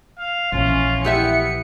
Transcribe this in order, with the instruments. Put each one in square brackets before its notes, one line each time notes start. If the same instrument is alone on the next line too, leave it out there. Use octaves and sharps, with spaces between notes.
[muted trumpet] F5
[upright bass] A#1 [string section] E3 C#4 [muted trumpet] F4
[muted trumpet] B3 [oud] E4 G4 E5 [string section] C#7